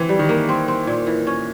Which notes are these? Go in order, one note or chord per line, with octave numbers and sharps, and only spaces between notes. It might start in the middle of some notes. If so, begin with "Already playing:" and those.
Already playing: E3 C4
G3
D#3
A#3
C4
C4
A#2
E3
C#4